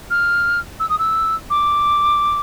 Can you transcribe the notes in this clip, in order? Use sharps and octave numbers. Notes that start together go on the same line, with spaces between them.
F6
E6
D#6
E6
D6